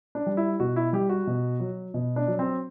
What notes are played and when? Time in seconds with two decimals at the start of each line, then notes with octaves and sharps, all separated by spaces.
0.15 D4
0.26 G3
0.37 E4
0.60 B2 F#4
0.76 E4
0.93 G3 G4
1.09 F#4
1.27 B2
1.60 F#3
1.94 B2
2.16 D4
2.28 F#3
2.39 C4